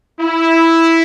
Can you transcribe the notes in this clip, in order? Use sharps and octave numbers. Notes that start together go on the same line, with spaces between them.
E4